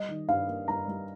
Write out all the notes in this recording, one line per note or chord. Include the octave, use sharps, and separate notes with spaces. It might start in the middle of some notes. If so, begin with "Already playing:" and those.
Already playing: G3 D#5
D#3
G2 F5
A#3
G2 A#5
G3